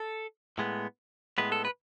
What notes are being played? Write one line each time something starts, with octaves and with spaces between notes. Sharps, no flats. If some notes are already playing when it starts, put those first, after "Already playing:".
Already playing: A4
A2 G#3 B3
A2 G#3 B3 B4
A4
B4